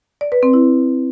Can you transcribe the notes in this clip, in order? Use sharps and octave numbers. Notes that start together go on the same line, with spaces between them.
D5
B4
C4
E4